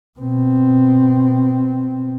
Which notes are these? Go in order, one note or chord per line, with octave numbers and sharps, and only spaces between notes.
B2 C4